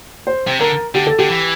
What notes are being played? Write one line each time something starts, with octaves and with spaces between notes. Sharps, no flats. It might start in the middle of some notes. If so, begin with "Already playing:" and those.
C5
C3
D3 A#4
D3 G4
A4
D3 G4
E3